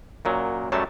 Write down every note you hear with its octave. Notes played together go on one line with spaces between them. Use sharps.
F#2 A#2 F#3
F#2 F#3 G3 A3 A5